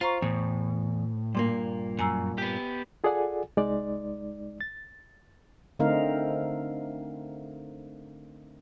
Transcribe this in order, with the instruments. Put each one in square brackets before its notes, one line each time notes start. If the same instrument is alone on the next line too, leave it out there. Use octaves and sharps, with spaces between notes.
[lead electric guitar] F4 [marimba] C5 A#5 C#6
[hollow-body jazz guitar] E2 [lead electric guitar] A2
[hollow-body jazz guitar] G2 A#2 A#3 [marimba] C6
[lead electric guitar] F#2 [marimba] G#5 A#5 E6
[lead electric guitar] B3 G4
[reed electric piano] F4 G#4 A4 D5 F#5 G#5
C2 G#3 D#4 D5
A6
[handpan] D3 A3 C4 D#4 A#4 F5